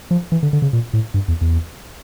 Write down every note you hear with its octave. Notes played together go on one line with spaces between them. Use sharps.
F3
E3
D3
D3
C#3
A#2
A2
G2
E2
E2